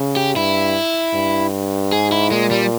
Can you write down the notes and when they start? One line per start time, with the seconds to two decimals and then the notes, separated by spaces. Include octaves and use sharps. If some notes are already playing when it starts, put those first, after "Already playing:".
Already playing: C#3
0.17 G4
0.36 G2 E4
1.14 G2
1.92 G#2 G#4
2.12 E4
2.31 A#2 G#3
2.51 G3